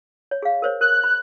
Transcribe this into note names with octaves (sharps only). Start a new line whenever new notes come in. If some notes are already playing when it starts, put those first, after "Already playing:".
C#5
G#4 F5
A#4 C5 C#5
A#4 F#6
B5